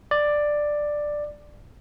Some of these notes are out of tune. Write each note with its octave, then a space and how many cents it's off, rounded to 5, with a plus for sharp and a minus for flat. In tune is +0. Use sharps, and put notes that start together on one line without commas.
D5 +10